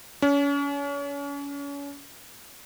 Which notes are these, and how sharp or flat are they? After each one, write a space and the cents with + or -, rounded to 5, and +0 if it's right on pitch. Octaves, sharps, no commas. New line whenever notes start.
C#4 +35